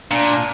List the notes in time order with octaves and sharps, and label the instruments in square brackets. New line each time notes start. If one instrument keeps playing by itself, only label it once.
[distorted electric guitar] A#2 [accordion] D4